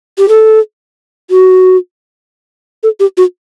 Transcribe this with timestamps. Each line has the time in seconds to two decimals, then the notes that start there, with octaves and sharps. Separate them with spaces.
0.18 G4
0.29 A4
1.31 F#4
2.83 A4
3.00 G4
3.17 F#4